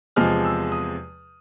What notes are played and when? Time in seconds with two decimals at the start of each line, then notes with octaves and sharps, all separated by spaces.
0.16 E2 C3 F3 G#3 F6
0.45 E6
0.72 D#6